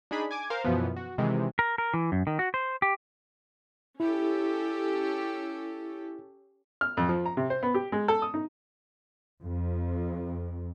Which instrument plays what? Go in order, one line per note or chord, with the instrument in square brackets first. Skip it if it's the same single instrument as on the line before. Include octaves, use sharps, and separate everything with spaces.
[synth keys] D4 D#4 G#4 B5
G#5 D6 G#6
A#4 C5 F5
F#2 B2 E3 F3 B3
F#4
C3 D#3 E3 G#3
[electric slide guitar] A#4
A#4
E3
F#2
D#3
F#4
C5
G4
[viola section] C#4 G4 A4 [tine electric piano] E4
[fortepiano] F6
F2
F3
A#5
C3
C5
B3
G4
G#3
A4
D#6
D#4
[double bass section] F2